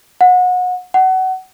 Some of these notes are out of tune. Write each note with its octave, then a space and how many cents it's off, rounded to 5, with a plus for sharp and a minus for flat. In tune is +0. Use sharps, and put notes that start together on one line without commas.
F#5 -30
F#5 +25